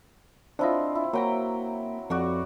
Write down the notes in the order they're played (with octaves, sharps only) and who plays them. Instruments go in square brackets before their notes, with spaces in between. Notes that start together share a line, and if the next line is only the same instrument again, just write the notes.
[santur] C4 E4 F4 [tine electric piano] D4 D#5
[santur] E4
[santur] F#3 G5 A#5 [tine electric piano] A#3
[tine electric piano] F2 [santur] F#4 D5 C#6